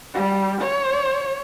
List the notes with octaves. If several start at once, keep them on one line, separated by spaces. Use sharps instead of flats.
G3
C#5